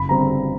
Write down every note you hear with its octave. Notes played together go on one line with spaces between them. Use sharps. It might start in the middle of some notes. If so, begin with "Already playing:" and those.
Already playing: F#1 B5
D3 G3 C4 A#5